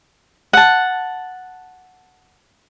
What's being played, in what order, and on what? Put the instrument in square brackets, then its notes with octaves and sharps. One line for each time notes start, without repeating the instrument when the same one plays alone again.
[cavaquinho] F#5 A5